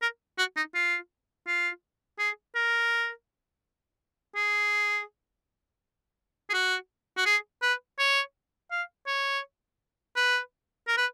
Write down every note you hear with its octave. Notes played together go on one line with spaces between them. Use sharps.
A#4
F#4
D#4
F4
F4
G#4
A#4
G#4
G#4
F#4
F#4
G#4
B4
C#5
F5
C#5
B4
A#4
B4